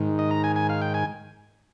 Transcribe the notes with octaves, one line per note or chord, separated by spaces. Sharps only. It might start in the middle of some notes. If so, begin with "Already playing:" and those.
Already playing: G#2 D#3
D#5
A#5
G#5
G#5
F5
G5
G#5